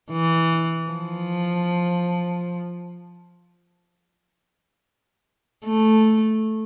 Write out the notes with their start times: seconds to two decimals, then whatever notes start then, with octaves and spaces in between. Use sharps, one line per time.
0.11 E3
0.90 F3
5.65 A3